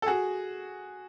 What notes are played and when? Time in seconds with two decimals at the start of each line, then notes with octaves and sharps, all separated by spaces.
0.02 A4
0.07 F#4 G#4